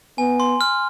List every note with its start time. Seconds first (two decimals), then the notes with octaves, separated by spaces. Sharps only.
0.18 B3 G#5
0.40 C6
0.61 F6